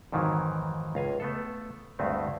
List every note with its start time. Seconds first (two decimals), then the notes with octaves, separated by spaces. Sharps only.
0.12 F2 G#2 D#3 E3 F#3
0.95 C#2 F5 G#5
1.20 A3 B3 A4
1.99 D2 G2 G#3 A3 C4